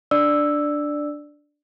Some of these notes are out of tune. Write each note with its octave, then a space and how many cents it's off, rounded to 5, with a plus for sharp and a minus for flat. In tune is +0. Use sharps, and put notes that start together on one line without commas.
D4 +0 D5 +10 E6 +0